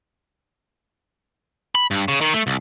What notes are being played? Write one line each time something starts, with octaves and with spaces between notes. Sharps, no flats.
B5
G2
C#3
D#3
A3
C2